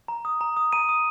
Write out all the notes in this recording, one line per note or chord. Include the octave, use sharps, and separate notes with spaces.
A#5
D#6
A#5
D#6
A#5 D#7
D#6